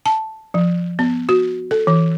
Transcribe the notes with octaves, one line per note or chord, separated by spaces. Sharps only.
A5
F3
B3
F#4
A4
E3